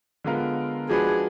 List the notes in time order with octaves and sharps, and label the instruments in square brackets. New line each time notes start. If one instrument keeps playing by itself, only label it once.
[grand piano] D3 G#3 B3 F4 A#4
[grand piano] F3 G#3 D4 F#4 B4 [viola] G#4